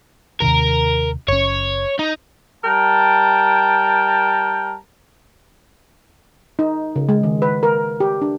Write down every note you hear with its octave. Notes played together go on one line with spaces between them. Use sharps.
D#2 C3 D#3 A#4
F#1 C#4 C#5
D#4
G3 A#4 G5 A5
D#4
C#3
G#3
D#3
B4
A#4
G4
D4